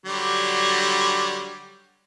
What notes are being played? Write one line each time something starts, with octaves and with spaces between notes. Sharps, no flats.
D3 F#3 G3